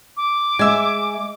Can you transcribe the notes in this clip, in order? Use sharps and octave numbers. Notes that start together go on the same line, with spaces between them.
D6
G#3 E5 G#5